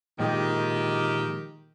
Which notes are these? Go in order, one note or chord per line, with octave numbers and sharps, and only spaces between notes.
A#2 D#3 F3 G#3 G4